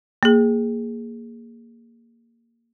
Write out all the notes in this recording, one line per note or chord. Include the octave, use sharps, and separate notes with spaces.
A#3 G#4